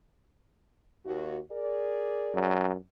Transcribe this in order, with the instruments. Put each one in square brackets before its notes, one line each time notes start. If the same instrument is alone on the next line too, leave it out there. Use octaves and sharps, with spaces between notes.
[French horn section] D#2 F#4
G#4 A#4 D5
[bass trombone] F#2